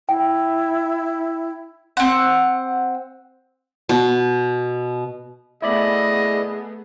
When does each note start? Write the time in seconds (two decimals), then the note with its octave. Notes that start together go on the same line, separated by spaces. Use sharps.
0.09 E4 G5
1.97 C4 F#5
3.89 B2
5.62 A3 B3 E4 G#4 D5 D#5 B5